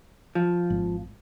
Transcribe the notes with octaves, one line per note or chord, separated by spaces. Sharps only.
F3
G#1